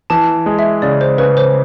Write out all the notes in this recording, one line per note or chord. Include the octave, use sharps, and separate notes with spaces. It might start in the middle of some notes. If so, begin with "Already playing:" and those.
E3 A5
G#3
E5
C#3 D5
C5
C#3 B4
C5